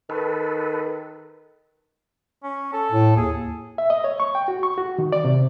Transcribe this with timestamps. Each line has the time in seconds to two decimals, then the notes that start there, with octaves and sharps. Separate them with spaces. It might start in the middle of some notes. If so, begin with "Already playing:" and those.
0.10 D#3 A4 B4
2.43 C#4
2.73 A4
2.92 A2
3.17 D#2 G#4
3.78 E5
3.90 D#5
4.04 C#5
4.20 C#6
4.35 G5
4.48 F#4
4.63 C#6
4.78 F#4
4.99 D#3
5.12 D5
5.25 C3